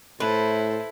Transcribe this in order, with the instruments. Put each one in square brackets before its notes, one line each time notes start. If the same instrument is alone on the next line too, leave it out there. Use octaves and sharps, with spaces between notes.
[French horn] A2 [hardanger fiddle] E4 [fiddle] A4 C5 [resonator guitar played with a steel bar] B4